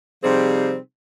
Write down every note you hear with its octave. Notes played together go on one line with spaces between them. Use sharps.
C3 F3 G3 C4 D#4 G#4